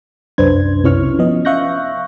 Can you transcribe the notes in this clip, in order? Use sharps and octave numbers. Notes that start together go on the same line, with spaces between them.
C2 F#2 D4 B4 C5 G#6
C3 C#4 E4 C#5 C#6 F6
F3 B3 C#4 D#5
E5 F5 C#6 F#6 G6 A#6